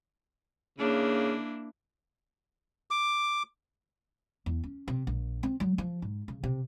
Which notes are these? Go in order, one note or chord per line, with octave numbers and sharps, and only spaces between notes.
C#3 A#3 D4 E4
D6
E2
C#4
C3
A#1
C4
F#3
F3
G#2
C#3
C3